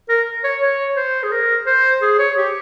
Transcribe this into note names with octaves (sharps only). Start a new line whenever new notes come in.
A#4
C#5
C#5
C5
G#4
A#4
C5
G#4
C#5
G4